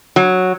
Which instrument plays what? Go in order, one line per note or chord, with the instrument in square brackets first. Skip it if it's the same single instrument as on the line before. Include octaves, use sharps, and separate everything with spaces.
[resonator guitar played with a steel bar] F#3